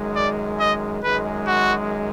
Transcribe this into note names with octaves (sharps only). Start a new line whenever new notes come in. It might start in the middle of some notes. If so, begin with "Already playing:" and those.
Already playing: F#2 D#3 G#3
D5
D#5
F#2 D#3 G#3 B4
F#4